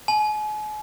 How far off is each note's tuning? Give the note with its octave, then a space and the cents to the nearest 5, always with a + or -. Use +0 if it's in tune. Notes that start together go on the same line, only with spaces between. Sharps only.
G#5 +40